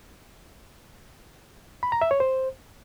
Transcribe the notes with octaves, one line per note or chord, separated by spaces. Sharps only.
B5
A#5
E5
C#5
C5